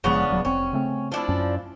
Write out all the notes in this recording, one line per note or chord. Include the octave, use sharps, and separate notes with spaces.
F1 C#3 F3 G#3 B3 D4
D#1 F#3
F1 C4 C#4
C#3 A3 C4
F3 D4 E4
F#2 C#4